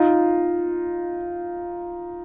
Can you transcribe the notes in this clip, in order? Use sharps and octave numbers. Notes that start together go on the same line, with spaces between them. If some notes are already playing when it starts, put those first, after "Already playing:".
Already playing: D#4 F4